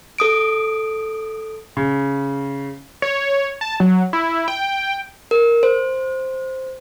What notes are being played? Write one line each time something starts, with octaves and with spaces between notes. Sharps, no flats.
A4 D#6 D7
C#3
C#5
A5
F#3
E4
G5
A#4
C5